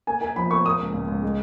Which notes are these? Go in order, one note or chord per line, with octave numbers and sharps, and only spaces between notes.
A#3 G#5
A#3 G#5
F3 B5
A#3 C#6
A#3 D#6
C#2
C#2
C#2
G#3